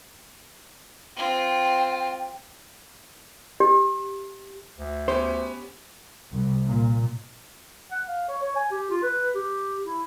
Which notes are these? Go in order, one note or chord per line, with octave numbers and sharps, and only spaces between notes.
C4 F4 G5
G4
D2
B3 C#4 G4 C5
C2
A#2
F#5
F5
C#5
C#5
G#5
G4
F4
B4
G4
E4